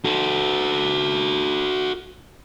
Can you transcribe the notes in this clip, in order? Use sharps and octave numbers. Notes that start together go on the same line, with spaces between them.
F#4 A4